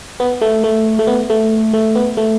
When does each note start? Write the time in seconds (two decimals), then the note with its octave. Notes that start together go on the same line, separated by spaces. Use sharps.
0.20 B3
0.42 A3
0.64 A3
0.99 A3
1.07 B3
1.30 A3
1.73 A3
1.96 B3
2.17 A3